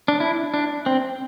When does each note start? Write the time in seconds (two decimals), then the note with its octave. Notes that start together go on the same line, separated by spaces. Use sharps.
0.08 D4
0.20 E4
0.54 D4
0.86 C4